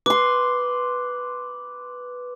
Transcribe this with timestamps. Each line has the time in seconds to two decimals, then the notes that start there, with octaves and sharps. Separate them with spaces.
0.06 B4 C6 D6